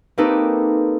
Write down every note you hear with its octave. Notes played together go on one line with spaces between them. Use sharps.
A#3 C4 D#4 G4 A4 B4